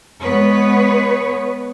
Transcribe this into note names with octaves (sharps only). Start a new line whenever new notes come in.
G#3 B3 B4 C#5